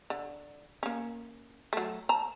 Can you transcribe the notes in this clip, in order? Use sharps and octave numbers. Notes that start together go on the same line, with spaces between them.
D3
A#3 C#4
F#3 A3
A5 A#5